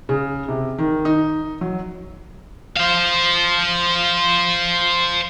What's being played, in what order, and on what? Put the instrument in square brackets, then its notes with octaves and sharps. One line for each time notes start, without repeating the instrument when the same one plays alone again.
[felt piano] C#3
C3
D#3
D#4
F#3
[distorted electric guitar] C5 F5